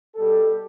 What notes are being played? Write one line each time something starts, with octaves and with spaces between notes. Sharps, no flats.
B2 G3 G4 A4